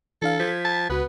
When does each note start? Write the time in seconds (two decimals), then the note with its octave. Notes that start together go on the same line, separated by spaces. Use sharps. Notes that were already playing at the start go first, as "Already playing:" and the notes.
0.22 E3 D4 A4 F5
0.40 F3 G#6 B6
0.64 A5
0.90 C#2 B3 F#4 B4